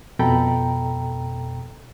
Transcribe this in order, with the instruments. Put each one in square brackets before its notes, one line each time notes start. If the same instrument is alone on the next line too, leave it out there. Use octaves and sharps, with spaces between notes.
[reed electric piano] F2 B2 A4 G5 A#5 B5